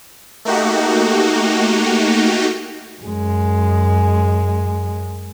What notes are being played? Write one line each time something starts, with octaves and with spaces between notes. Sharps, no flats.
A3 A#3 D#4 F#4 G4
F#2 G#3